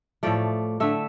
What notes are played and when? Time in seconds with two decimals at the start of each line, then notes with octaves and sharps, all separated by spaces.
0.23 A2 F3 A3 D5
0.80 D3 A3 E5